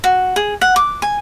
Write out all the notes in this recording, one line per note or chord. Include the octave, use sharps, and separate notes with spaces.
F#4
G#4
F#5
D6
G#5